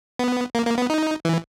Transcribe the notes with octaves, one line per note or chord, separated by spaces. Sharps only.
B3
A#3
A#3
B3
D#4
E3